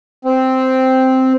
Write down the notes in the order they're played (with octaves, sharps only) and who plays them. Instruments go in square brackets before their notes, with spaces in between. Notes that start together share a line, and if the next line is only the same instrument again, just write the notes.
[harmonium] C4